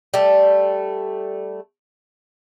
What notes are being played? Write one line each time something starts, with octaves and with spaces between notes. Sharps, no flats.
G3 A3